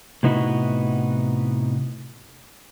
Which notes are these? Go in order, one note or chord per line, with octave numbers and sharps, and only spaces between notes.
A2 C3 B3 D#4 E4 F#4